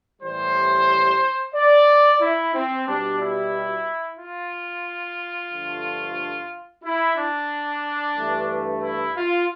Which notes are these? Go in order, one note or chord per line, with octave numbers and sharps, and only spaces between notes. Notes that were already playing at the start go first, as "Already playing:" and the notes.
A2 E3 G3 C5
D5
E4
C4
B2 G3 D4
E4
F4
G2 D3 F3 A3
E4
D4
G2 E3 A3
E4
F4